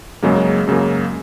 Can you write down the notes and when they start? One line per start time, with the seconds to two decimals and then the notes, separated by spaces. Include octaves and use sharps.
0.23 F#2 C#3 F#3 G#3 A#3
0.67 F#2 C#3 F#3 A#3